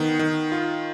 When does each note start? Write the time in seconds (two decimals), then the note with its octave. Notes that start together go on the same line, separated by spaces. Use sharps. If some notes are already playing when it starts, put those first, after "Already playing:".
Already playing: D#3 B3
0.19 D#3
0.52 F4